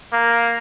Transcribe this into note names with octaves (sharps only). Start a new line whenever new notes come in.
A#3